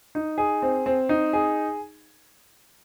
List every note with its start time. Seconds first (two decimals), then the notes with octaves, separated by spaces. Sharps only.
0.15 D#4
0.38 G#4
0.62 C4
0.86 C4
1.09 D#4
1.33 G#4